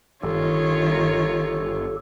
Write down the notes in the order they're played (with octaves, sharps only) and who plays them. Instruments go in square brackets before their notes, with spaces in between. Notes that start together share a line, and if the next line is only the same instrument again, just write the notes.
[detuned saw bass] G1 [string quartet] D#3 [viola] F4 C#5 [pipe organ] G4 A4